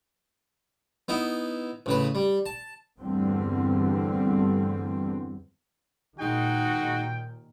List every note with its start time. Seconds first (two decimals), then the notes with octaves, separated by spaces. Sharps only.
1.08 B3 D#4 E4
1.86 A1 C#3 B4
2.15 G3
2.46 A5
2.98 E2 G2 D3 G3 A3 C4
6.20 D#2 A#2 D#3 G#3 D#4 F#4 G5